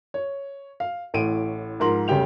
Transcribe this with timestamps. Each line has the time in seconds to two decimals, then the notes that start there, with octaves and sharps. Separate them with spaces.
0.14 C#5
0.80 F5
1.14 A1 A2 D7 D#7
1.80 G#2 F3 A#4 C6 F#7
2.08 F1 C#3 G3 G4 G5 F7